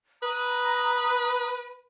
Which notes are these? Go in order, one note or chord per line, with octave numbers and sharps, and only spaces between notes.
B4 A#5 D#6